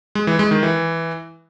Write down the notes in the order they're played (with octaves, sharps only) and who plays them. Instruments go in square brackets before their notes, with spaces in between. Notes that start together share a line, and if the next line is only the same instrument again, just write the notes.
[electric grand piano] G#3
E3
G#3
D#3
E3